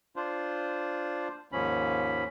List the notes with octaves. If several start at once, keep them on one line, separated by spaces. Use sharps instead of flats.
D4 F4 C5
D#2 G#2 F3 C#4 B5